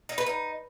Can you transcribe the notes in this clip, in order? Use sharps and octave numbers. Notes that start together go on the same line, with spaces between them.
D#4
B4
D#4